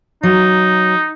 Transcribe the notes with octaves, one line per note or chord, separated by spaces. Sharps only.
F#3 D#4